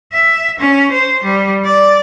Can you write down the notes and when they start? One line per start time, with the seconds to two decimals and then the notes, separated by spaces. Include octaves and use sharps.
0.13 E5
0.60 C#4
0.92 C5
1.24 G3
1.65 D5